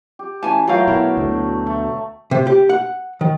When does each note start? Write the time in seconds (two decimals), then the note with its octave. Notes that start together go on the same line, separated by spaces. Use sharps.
0.19 G4
0.43 E3 C#4 G#5 A5
0.67 F#3 A3 F4 A#4 F5 G5
0.87 B2 E4 A#4 F5
1.17 D2 B2
1.67 A3
2.31 C3
2.47 G4
2.69 F#5
3.21 D#3